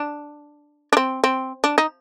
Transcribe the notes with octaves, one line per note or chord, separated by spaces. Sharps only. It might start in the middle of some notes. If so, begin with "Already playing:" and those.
Already playing: D4
D4
C4
C4
D4
D#4